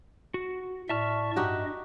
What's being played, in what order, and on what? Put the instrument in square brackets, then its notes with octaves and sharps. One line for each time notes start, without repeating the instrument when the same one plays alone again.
[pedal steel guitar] F#4
[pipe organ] A2 D5 C#6 [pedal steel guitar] E5 A5 F6
[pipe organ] G2 D#5 [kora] D#4 F#4 G4